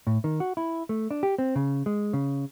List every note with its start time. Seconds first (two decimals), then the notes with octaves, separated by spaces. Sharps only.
0.07 A2
0.24 D#3
0.40 F#4
0.57 E4
0.89 A3
1.11 D4
1.23 G4
1.38 C4
1.56 C#3
1.86 G#3
2.13 C#3